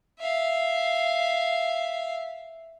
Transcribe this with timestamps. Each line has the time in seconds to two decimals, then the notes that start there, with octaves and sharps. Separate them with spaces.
0.19 E5 F5